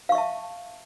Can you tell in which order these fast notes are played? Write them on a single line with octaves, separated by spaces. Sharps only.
F5 C#6 E5 A5